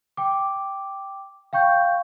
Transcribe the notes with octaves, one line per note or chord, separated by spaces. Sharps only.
G5 D6
F5 G5 C#6 G6